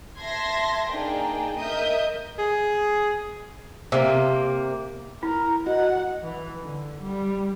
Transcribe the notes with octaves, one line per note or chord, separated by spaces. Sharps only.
E5 A5 C6 G#6 A#6
A#3 D4 D#4 G#4 G5
A#4 D#5 E5 D#6 G6
G#4
C3 A#3
E4 A#4
F#4 D#5 F#5
E3
D3
G3